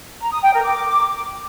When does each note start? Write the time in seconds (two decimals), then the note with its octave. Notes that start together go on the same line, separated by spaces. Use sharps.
0.21 A#5
0.32 D#6
0.42 G5
0.53 A#4
0.64 D6